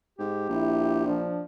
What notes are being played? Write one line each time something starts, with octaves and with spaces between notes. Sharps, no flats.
G#2 G4
A#1 E4
F3 D4